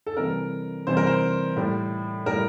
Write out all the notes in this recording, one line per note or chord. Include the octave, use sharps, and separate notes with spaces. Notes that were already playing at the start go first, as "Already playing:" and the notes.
A4
C3 E3 G3 A#4
C3 E3 G3 C5
A#4
C5
A2 G3
A2 G3 A#4